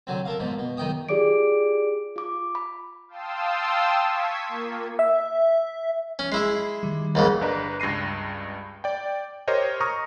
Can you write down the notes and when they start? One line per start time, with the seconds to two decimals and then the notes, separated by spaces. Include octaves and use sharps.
0.07 D3 F#3 C4
0.25 A4 A#4 F5
0.39 G#2 B2 F3
0.59 B2
0.77 B1 D#3 D#5 G5 D#6
1.09 F4 G4 G#4 D5 D6 D7
2.16 F4 D6
2.55 B5
3.08 F5 G5 A5 C6 D#6 E6
4.02 C#6 G#6 B6
4.48 A#3 F4
4.99 E5
6.19 C#4
6.32 G#3 E4 E5 C7
6.83 D#3 G3
7.15 D#2 G#2 C#3
7.41 G1 D4 B4 A#5
7.80 C#2 G2 A#6 C7 D#7
8.84 D5 G5
9.48 G4 A#4 C5 C#5 D#5
9.80 A#5 C#6 D#6 F6 A#6